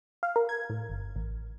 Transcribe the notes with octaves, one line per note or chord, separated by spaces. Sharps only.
F5
A#4
G#6
A2
G1
A1